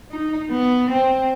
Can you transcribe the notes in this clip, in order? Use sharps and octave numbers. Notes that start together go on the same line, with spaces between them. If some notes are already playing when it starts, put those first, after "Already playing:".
D#4
B3
C4